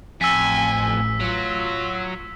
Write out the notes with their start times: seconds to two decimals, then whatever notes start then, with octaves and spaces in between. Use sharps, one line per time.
0.21 A1 F2 G#5 E6 B6
1.20 F#3 F4